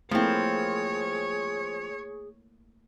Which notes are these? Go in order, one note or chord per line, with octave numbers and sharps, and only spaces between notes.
F3 A3 A#3 C4 E4 G#4 C#5